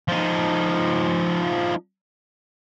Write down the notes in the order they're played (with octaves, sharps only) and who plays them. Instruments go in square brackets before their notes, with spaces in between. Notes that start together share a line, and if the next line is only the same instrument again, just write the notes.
[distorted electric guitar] F3 D#4